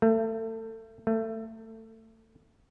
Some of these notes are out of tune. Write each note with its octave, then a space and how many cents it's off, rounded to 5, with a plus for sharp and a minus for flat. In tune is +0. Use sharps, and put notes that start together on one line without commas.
A3 +30
A3 +25